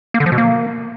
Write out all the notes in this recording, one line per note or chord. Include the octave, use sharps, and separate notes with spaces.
A#3
D3
F3
B2
A#3